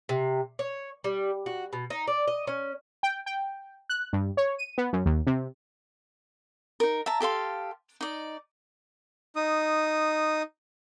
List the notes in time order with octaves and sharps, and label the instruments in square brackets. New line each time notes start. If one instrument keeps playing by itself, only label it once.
[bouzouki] C3
C#5
G3
F#4
B2
D#4
D5
D#5
C#4
[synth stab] G5
G5
F#6
G2
C#5
D#7
B3
F#2
D#2
C3
[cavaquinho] D#4 A#4
E5 A5 A#5
G4 A4 F5 C6
D#4 D5
[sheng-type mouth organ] D#4 D#6